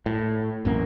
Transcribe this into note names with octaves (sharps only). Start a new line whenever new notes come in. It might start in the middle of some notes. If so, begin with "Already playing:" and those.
A2
A1 F#2 A#3